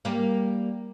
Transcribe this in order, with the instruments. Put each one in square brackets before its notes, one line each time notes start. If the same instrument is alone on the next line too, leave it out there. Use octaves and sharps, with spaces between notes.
[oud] G3 A#3